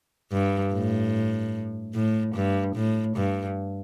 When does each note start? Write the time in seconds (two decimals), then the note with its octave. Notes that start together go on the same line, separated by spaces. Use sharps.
0.32 G2
0.73 A2
1.95 A2
2.35 G2
2.76 A2
3.16 G2